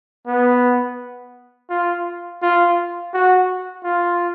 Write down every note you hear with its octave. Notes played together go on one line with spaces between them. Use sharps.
B3
F4
F4
F#4
F4